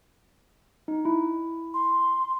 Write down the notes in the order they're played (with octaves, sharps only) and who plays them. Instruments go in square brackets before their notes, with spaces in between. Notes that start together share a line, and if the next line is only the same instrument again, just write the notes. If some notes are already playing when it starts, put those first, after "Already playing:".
[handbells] D#4
E4
[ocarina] C6